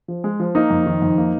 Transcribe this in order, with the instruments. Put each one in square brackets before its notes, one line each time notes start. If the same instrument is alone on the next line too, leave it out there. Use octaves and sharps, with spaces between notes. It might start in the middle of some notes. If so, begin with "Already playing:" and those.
[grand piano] F3
G#3
F3
[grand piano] A#3 [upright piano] D#4
[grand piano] F2
D#3
F2
A#3